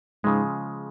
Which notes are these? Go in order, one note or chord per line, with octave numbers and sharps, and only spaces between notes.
G#2 C#3 F3 G#3